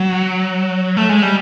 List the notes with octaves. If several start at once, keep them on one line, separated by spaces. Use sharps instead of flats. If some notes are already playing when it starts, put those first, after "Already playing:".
Already playing: F#3
A3
G#3
G3